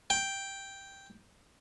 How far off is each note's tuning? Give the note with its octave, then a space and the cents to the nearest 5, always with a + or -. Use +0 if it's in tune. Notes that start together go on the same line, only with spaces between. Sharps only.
G5 +0